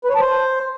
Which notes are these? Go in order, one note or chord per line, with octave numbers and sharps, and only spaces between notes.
B4
C#5
A5
C5